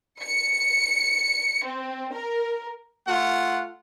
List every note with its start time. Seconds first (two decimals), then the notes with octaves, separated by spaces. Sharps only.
0.24 C#7
1.65 C4
2.14 A#4
3.07 A3 F4 F#5